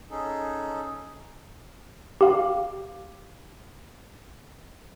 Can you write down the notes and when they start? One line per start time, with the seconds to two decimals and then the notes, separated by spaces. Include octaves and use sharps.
0.10 C#4 D#4 G#4 A4
2.21 G4 F5